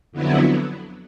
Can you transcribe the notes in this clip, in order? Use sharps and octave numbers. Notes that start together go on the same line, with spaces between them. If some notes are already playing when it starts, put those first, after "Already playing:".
F2 D3 F#3 B3 E4